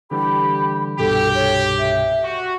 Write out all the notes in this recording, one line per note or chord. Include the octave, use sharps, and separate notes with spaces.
D3 E3 G3 G4 B5
C2 G2 B2 G4 A4
C#5
E5
F#4 C#6